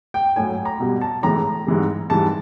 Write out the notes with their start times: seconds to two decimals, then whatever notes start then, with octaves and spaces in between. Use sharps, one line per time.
0.14 G5
0.36 A2 F#3 G#5
0.65 A#5
0.80 B2 G3
1.01 A5
1.23 A2 E3 G#3 A#5
1.67 G#2 E3 G3
2.10 G#2 E3 G3 A5